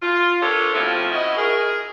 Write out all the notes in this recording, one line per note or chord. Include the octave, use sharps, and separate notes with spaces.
F4
D4 G4 A4 A#4 C5 C#5
B2 F3 A3 C4 E4 F4
C#4 E4 F#4 D#5
G#4 A#4